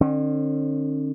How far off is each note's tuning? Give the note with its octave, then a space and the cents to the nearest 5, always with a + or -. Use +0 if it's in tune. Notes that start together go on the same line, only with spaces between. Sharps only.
D3 +45 C#4 -45